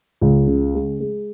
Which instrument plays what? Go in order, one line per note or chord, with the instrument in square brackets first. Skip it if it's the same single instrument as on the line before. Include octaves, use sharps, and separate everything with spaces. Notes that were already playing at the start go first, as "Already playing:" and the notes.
[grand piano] C#2
C#3
G#3
G#3